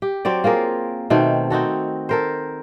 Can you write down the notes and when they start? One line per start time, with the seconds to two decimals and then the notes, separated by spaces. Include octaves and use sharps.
0.02 G4
0.25 F#3 C4 C#5 D5
0.44 A#3 F4 G#4 A#4
1.10 B2 D#3 A3 C4
1.50 C4 D#4 F#4 A4
2.09 A4 A#4 C5